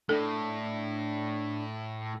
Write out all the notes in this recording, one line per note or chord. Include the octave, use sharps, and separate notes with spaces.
A2 D4 A4